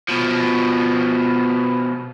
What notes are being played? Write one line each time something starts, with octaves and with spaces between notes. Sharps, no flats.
B2 F3